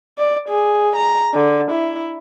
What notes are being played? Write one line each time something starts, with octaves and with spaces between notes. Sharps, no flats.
D5
G#4
A#5
D3
E4